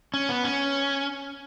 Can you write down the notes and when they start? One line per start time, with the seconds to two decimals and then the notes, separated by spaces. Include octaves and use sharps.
0.14 C#4
0.29 B3
0.44 C#4